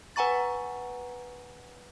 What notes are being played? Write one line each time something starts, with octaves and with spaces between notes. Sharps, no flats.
B4 F#5 G#5 A#5 C#6 A6